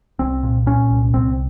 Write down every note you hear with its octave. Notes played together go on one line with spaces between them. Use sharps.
C2 C4
A#2
A#2 C#4
C2
C2 C4